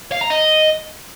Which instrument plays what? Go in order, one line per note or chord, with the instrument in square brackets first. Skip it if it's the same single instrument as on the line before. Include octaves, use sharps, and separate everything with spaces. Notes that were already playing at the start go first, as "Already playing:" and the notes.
[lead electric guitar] F5
A#5
D#5